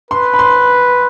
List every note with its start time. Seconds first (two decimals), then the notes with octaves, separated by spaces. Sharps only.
0.11 B4 C6
0.34 B5
0.39 C6